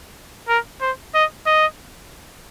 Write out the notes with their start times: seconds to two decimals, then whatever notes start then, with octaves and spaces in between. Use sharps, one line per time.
0.48 A#4
0.81 C5
1.14 D#5
1.46 D#5